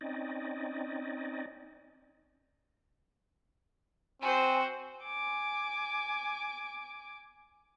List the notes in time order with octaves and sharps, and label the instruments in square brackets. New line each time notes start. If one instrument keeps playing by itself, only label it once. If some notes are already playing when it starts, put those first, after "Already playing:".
[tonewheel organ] C4 C#4 D#4 D5 D#5
[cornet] C4 [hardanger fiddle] F#4 C5 [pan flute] G#5
[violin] G#5 D6